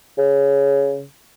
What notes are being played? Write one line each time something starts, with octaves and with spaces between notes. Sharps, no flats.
C#3